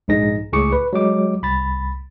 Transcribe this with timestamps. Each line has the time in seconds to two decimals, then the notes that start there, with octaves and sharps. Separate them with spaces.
0.08 A#1 G#2 D#4 G#4 A#6
0.52 C#2 A2 G#4 C#6 D6 C#7
0.72 B4
0.93 F#3 G#3 D6
1.42 C2 B5 A6